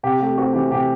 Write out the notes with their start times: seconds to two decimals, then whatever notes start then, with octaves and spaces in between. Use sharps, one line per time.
0.03 C3 G4
0.20 A3 G4
0.38 C4 F#4
0.53 E3 G4
0.71 C3 G4